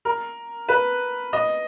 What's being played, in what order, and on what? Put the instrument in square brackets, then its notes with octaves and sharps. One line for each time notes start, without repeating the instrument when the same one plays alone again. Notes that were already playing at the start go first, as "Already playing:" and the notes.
[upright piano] A#4
B4
D#5